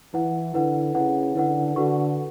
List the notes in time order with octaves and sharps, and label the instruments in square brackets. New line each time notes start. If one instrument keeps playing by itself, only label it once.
[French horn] E3 [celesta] E4 B4 F#5
[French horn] D3 [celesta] E4 B4 F#5
[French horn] C#3 [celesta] E4 B4 F#5
[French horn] D3 [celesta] E4 B4 F#5
[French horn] D3 [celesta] F#4 B4 F#5 C#6